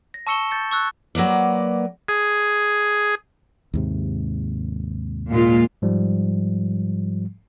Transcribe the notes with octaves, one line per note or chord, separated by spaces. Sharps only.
A#6
A5 C#6 E6 C#7 E7 G7
G6 A6 C#7
C#6 E6 F#6
F#3 A#3 B4 D5
G#4
D#2 G#2 C3
A#2 G#3 F4
G#2 F3 G3